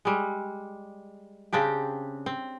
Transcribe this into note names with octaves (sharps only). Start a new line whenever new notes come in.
G3 G#3
C#3 C4 D4 G4
C4